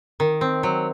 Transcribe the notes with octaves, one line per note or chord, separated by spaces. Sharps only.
D#3
C4
F#3